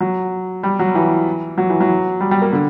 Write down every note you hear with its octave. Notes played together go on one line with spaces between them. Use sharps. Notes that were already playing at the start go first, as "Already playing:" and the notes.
F#3
G3
F#3
E3
F#3
E3
F#3
G3
G3
A#3
D3